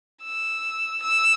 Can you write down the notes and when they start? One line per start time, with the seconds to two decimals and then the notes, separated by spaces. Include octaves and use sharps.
0.24 E6
1.03 E6